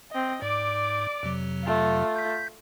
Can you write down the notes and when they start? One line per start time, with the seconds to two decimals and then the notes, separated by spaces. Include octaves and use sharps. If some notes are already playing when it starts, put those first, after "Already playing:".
0.11 C4 D#5
0.42 G#2 D5 D6
1.23 F2 C3 F#3
1.64 A3 F4
2.16 G6 B6